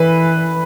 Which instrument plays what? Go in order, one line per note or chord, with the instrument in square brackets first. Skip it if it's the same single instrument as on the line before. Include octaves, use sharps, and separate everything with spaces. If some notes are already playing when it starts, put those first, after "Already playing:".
Already playing: [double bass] E3 [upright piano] B4